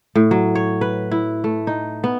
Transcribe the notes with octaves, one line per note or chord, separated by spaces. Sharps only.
A2
F#3
C#5
B4
E4
A3
D#4
B3